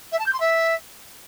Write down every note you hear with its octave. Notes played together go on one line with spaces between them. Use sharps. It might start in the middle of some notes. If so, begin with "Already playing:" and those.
E5
A5
G6
C6
E5